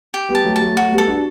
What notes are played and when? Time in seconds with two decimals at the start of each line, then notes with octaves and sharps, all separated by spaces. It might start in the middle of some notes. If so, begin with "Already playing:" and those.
0.14 G4
0.29 G3 B3
0.35 A5
0.45 F#3 A3
0.56 A5
0.61 F#3 A3
0.76 F#3 A3 F#4
0.92 G3 B3
0.98 A4
1.08 D4 F#4